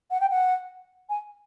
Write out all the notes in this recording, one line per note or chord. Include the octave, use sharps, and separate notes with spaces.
F#5
G5
F#5
G#5